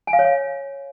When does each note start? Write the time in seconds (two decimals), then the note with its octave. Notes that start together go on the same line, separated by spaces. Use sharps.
0.07 G#5
0.13 F5
0.19 C#5
0.25 F5